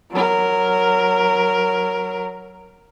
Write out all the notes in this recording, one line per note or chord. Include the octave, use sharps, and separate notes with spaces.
F#3 A#4